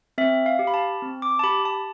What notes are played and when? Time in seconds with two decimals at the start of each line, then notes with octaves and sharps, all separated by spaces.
0.18 C4 E5
0.46 F5
0.59 G4
0.67 B5
0.74 A5
1.02 C4
1.22 D6
1.39 A5
1.44 G4 B5
1.65 A5